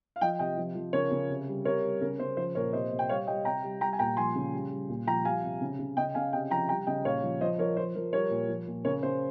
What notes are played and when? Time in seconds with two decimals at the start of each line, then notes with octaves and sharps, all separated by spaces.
0.16 F5
0.21 F3 D#5 G5
0.39 C3 D#5 G5
0.58 F3
0.75 F3
0.93 C#3 A#4 C#5
1.11 C#3
1.29 C3
1.48 G3
1.65 C3 A#4 C#5
1.83 G3
2.01 C#3 A#4
2.19 C#3 C5
2.37 F3 C5
2.55 A#2 A#4 C#5
2.73 C3 C5 D#5
2.92 C3
2.99 G5
3.09 G3 C#5 F5
3.27 G3 D#5 G5
3.45 C3 G5 A#5
3.64 G3
3.81 G3 G5 A#5
3.93 G#5
3.99 A#2 G5 A#5
4.17 F3 G#5 C6
4.35 C#3
4.53 G3
4.71 G3
4.89 A#2
5.07 F3 G5 A#5
5.25 G3 F5 G#5
5.43 C3
5.61 C#3
5.79 C#3
5.97 C#3 D#5 G5
6.15 C#3 F5 G#5
6.33 C3 D#5 G5
6.51 F3 G5 A#5
6.69 G3 G5 A#5
6.87 C#3 D#5 G5
7.05 A#2 C#5 F5
7.23 F3
7.41 F3 C5 D#5
7.59 F3 A#4 C#5
7.77 F3 C5
7.95 F3 A#4
8.13 G3 A#4 C#5
8.30 A#2
8.49 F3
8.67 A#2
8.85 C#3 A#4 C#5
9.03 C#3 C5